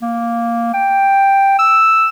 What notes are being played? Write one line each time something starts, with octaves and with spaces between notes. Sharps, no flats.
A#3
G5
E6